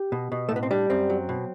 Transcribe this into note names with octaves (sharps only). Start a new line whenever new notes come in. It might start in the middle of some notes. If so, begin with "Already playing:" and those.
Already playing: G4
B2
B2
A2 A3
B3
C4
G3 D4
F#2 C4
F#3
B2